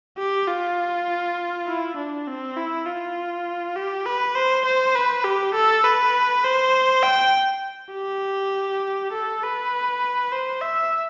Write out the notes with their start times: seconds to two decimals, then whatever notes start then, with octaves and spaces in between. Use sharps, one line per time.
0.19 G4
0.48 F4
1.67 E4
1.97 D4
2.28 C4
2.57 E4
2.87 F4
3.76 G4
4.06 B4
4.36 C5
4.66 C5
4.95 B4
5.24 G4
5.55 A4
5.84 B4
6.45 C5
7.03 G5
7.93 G4
9.13 A4
9.42 B4
10.32 C5
10.61 E5